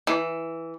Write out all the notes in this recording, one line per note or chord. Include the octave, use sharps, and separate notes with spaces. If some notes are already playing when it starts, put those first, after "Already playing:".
E3